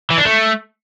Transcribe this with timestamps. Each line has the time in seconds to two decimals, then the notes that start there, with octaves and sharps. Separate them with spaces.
0.10 E3
0.18 D4
0.25 A3